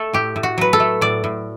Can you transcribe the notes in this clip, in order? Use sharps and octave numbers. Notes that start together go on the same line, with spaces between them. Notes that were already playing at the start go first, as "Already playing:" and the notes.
Already playing: A3 A4
A2 G4
A2
F#4
F#3 B4
A4
A3
A2 D5
A2